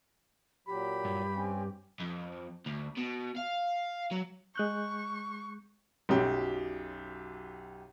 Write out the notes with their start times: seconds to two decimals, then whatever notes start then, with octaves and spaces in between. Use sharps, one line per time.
0.67 A#2 F#3 G4 B5
1.05 G2
1.33 C4 C#4
2.00 F2
2.66 D2
2.97 B2
3.36 F5
4.11 F#3
4.56 G#3 C#6 F#6 G6
6.09 B1 F#2 G4